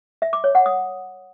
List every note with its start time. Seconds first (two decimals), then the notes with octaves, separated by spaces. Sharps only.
0.22 E5
0.33 D6
0.44 C#5
0.55 F#5
0.66 D#6